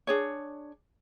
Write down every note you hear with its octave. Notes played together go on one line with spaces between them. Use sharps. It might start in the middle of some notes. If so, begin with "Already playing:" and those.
D4 G#4 C#5